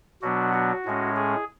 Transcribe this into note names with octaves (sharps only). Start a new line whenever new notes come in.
B2 F#3 B3 D4 F#4
F#4
A2 G#3 C#4
G#4